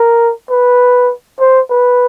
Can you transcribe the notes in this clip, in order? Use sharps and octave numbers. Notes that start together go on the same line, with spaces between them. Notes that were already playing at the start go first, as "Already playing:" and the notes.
Already playing: A#4
B4
C5
B4